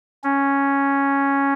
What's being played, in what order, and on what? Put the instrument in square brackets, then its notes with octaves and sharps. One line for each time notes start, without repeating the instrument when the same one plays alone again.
[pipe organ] C#4